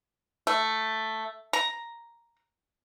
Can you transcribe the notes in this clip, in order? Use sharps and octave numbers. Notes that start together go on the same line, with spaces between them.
A3
A#5